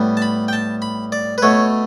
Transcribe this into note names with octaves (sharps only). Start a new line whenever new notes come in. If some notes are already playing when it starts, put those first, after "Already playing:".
Already playing: A2 G3 B3
A5
B5
G5
A5
B5
D5
B4
B2 A3 C#5